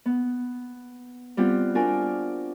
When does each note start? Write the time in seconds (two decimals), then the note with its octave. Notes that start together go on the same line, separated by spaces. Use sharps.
0.06 B3
1.37 G3 B3 C4 F4
1.75 D4 F4 F#4 A#4 D5 G#5